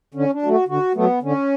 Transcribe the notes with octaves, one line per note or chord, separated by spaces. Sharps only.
D3 C#4
D4
F#3 A3
F#4
D3 F#4
F#3 A3 B3
D3 C#4